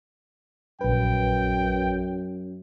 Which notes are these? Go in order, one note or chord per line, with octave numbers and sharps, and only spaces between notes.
A#1 F#2 B4 G5